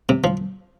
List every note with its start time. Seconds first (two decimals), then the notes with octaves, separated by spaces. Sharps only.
0.09 C3
0.24 F3